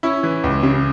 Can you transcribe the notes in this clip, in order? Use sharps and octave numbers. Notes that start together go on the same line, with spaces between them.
C#4 E4
E3
C#2
C#3